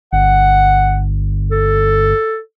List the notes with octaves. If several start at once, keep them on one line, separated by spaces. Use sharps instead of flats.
G1 F#5
A4